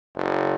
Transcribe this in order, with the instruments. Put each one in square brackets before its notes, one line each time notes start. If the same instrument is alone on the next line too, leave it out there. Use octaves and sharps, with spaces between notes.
[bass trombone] F#1